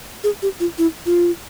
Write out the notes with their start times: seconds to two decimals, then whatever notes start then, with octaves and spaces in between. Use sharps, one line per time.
0.24 G#4
0.42 G4
0.60 F4
0.78 E4
1.06 F4